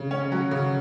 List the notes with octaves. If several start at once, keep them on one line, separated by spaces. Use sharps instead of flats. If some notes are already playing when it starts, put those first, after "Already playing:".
Already playing: C#3
C#4
F#3
C#3